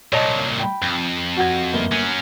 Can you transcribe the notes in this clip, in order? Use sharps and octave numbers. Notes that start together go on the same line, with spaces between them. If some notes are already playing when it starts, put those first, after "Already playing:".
C2 A#2 C#5 D#5 A5
G5 B5
F2
F#4 F#5 G#6
G1 A#3 G7
F#3 C#4